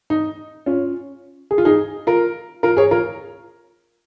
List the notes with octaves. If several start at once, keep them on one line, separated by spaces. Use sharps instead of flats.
D#4
C#4 F4
G#4
F4
D#4 G#4
F4 A#4
F4 A#4
G#4 C#5
F4 A#4